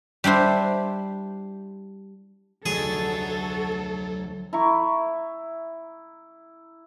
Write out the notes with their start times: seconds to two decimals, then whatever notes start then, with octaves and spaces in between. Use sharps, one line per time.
0.24 G3 D4 E4 C5
2.66 F1 D2 F#3 G#4 A4
4.53 E4 A#5 C#6